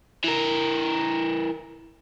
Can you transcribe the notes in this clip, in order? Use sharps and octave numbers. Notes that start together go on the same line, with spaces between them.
E3 A#4